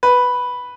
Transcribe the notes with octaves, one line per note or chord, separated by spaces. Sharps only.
B4